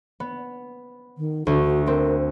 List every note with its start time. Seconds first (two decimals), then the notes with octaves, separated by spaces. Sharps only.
0.20 B3
1.18 D#3
1.47 D2 F#4
1.87 C4 A#4